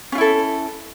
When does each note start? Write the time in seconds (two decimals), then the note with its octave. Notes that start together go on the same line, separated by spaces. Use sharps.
0.12 C#4
0.15 F4
0.18 E4
0.21 A4